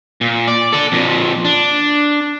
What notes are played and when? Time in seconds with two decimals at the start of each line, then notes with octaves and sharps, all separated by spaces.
0.21 A#2
0.48 D5
0.73 A4 D5
0.92 F2 A#2
1.45 D4